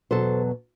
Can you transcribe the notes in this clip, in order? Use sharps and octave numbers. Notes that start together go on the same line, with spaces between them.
E2 B2 F#3 A4 C5